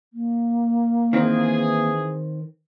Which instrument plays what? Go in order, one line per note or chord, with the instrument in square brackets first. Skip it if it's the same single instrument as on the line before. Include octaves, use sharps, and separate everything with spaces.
[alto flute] A#3
[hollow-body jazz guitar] D#3 C4 [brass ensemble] E3 G#4